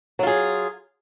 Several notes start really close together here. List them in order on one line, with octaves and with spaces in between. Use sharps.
F#3 F4 G#4